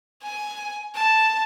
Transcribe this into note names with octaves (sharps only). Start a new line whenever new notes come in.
G#5
A5